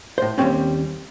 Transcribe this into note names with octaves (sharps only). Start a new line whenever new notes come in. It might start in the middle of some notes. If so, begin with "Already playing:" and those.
A2 C5
D#2 E3 G3 C4 C#4